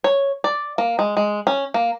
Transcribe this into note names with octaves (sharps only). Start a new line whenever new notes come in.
C#5
D5
A#3
G#3
G#3
C#4
A#3